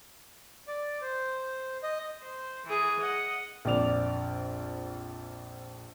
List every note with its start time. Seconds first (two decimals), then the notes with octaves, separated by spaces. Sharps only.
0.68 D5
1.01 C5
1.83 D#5
2.20 C5
2.66 E3 G#4
3.00 D#5 F#5
3.65 A#1 F2 D5 F7